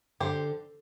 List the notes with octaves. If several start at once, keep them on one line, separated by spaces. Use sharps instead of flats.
D3 G4 C5